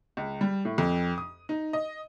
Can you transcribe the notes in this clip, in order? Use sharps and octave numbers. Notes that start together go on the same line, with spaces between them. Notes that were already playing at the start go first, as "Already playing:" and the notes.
C#2
G3
A2
F2
D#6
D#4
D#5